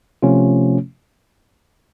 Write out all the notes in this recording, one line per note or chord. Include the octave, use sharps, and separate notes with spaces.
C3 F3 A3 C#4 F4